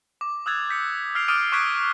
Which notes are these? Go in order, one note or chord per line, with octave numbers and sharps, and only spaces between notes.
D6
D#6 E6 F#6 G#6 A6 F7
G6 B6 C#7
E6 F6 B6 C7 D7 F7
D6 D#6 F6 A6 D7 D#7
C#6 D6 F#6 G#6 B6 D7